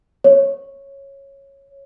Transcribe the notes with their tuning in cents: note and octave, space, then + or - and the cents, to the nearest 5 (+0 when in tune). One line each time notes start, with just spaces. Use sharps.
C#5 -10